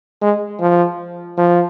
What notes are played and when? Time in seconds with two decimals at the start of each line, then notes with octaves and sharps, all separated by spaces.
0.21 G#3
0.60 F3
1.38 F3